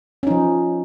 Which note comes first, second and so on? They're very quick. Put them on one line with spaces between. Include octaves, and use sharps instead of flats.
C#4 D#4 F3